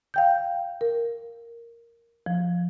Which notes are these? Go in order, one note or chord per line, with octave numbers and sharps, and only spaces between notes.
F5 G5 G6
A#4
F3